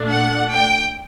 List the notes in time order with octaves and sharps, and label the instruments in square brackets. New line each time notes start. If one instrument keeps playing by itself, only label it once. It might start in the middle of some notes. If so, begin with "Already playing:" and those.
Already playing: [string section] A#2 A3 D4
F#5
G5